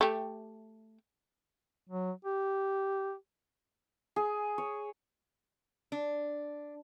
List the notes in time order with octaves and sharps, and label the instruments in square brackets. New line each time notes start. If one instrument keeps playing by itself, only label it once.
[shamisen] A3 G4
[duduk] F#3
G4
[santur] G#4
C#5
[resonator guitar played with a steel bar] D4